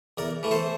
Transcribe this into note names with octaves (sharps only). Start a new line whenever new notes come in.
E2 A#4 D5
E3 A3
A4 C5